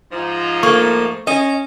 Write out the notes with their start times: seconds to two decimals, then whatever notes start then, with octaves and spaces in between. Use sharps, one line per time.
0.12 G#2 F3 D#4
0.63 A3 A#3 C#6
1.27 C#4 D#5